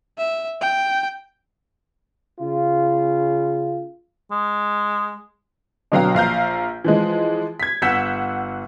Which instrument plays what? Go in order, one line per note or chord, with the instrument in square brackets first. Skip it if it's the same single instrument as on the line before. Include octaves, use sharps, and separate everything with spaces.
[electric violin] E5
G5
[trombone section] C#3 F4
[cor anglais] G#3
[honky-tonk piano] B2 D3 F#3 F5 G5 A#5
A#1 F5 A#5 G6
E3 F3 G#3
G#6 B6
G1 F#5 E6 G6 B6 E7